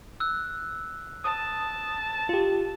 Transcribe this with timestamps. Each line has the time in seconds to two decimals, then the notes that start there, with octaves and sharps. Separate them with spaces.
0.20 E6 F#6
1.24 A5 D#6
2.29 F4 G4